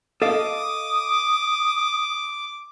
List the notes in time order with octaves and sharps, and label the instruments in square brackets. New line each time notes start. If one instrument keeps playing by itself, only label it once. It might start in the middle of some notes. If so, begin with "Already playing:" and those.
[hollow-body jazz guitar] A4 D#5 F5 [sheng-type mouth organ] D6 [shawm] D#6